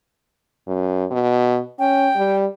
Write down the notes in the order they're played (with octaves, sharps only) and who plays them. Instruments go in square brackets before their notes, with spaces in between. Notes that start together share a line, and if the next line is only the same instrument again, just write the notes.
[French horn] F#2
B2
[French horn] C#4 [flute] G5
[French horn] G3